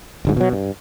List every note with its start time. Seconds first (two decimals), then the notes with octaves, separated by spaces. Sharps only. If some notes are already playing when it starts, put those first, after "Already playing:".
0.25 D1 D2 G#2
0.37 B2 F#3
0.52 G2